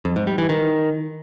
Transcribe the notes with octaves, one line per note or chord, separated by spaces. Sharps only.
F2
G#2
G3
E3
D#3